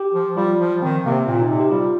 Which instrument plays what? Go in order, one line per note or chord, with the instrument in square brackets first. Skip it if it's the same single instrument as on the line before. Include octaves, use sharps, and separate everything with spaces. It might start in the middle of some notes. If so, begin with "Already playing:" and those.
Already playing: [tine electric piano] G4
[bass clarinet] F3
[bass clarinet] G3 [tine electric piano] F4
[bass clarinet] F3
[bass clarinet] D#3 [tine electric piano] C4
[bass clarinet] C3 [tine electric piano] A#3
[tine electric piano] C4
[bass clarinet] A#2
[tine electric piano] F4
D#4
[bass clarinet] C3
[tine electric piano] G4
[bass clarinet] G3 [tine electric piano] F4